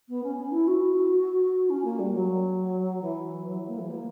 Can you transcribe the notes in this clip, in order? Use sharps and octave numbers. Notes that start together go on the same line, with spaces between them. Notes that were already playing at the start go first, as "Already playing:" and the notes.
B3
C#4
C#4
E4
F#4
C#4
A#3
G3
F#3
E3
F#3
A#3
E3
A#3